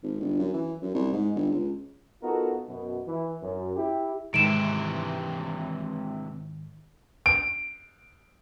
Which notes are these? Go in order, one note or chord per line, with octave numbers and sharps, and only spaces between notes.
G#1
G1
F#2
E3
F#2
C2
G#2
G1
C#2
B3 D#4 F4 F#4 A4 A#4
F#2 B2
E3
F#2
E4 G4
G#2 C3 D#3 E3 G#3 D7 E7
D7